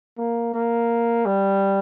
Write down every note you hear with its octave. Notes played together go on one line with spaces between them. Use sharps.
A#3
A#3
G3